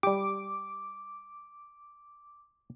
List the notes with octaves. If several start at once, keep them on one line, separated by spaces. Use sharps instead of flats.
G3 G4 D6